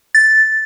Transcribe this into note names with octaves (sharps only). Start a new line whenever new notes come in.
A6